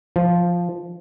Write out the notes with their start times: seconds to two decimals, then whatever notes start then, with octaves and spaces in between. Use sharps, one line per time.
0.16 F3